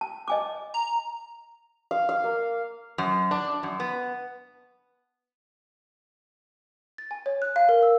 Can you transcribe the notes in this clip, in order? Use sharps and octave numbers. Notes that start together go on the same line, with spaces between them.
A5
D#5 G#5 D6
A#5
F5
F5
A#3
F#2
D4
F#2
B3
A6
G#5
C#5
F#6
F5
A#4
E6